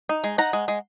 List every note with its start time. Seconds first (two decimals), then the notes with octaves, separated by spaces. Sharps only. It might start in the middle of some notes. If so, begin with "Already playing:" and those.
0.09 D#4
0.24 G#3
0.38 D#4 F#5 A#5
0.53 G#3
0.68 G#3